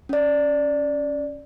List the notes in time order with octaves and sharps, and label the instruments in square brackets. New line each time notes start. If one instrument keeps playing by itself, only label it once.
[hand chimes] C#4 D5